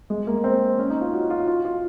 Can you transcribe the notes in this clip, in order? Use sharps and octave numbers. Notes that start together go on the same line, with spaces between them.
G#3
A#3
C4
C#4
D#4
F4
F#4
F4
F4
F4